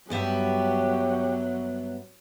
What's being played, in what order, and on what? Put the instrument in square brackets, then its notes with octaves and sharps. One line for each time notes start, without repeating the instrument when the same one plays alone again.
[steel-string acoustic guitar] G2 B3 E5 [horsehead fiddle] F#3 [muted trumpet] G4